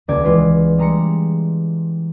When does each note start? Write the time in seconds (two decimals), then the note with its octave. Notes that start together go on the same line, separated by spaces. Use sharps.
0.08 D#1 C#2 A#3 D5 G#6
0.24 E3 G#3 F4 B4
0.78 G3 G#3 A#5 C6 C#7